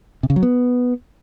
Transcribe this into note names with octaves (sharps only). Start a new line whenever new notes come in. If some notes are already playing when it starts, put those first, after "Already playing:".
C3
C#3
F#3
B3